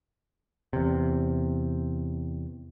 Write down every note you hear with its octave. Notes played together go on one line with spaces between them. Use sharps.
E2 C3